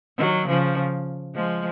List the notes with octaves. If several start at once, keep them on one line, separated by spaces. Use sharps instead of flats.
D#3 F#3
C#3 F3
F3 G#3